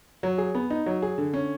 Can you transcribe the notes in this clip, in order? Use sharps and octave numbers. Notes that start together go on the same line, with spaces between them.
F#3
G#4
B3
D#4
F#3
G#4
D3
C#4